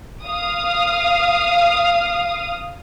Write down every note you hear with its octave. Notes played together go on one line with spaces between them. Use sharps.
F5 D#6